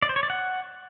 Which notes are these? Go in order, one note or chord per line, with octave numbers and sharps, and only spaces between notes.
D5
C5
C#5
D5
F#5